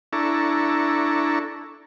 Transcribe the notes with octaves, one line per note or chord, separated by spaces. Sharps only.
D4 E4 A4 A#5 C#6